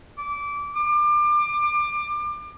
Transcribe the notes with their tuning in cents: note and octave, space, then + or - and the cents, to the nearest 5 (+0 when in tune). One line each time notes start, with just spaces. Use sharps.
D6 -20
D6 +30